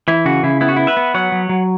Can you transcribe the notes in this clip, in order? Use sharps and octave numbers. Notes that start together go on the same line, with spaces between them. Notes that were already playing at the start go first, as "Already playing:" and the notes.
E3 E4
C#3 F#4
C#3 E4
B3 E4
F#4
B3 E4
B4 E5
B3
F#3 C#5 F#5
F#3
F#3